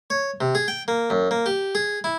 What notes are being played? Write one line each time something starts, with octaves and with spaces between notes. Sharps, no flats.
C#5
C3
G#4
G5
A#3
F#2
A#3
G4
G#4
E4